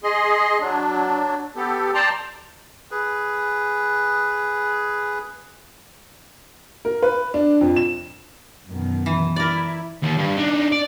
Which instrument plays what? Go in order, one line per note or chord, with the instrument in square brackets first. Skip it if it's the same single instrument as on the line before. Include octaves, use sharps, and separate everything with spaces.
[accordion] G#4 D#5 C6
F#3 D4
B3 G4 A4
D5 G5 A5 A#5 C6
[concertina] G#4 B4
[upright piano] A#4
B4
D4
F2
E7
[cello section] F#2 B2 D#3
[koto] E3
[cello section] E4 [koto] A#4 D5
[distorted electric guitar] D#2
G2
D4 D#4
D5